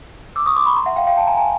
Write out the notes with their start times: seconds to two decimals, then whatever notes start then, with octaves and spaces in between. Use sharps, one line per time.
0.36 D6 E6
0.46 C#6 D#6
0.56 C6 D6
0.66 B5 C#6
0.76 A#5 C6
0.86 E5 F#5
0.96 F5 G5
1.07 F5 G5
1.17 G5 A5
1.27 G#5 A#5
1.37 G#5 A#5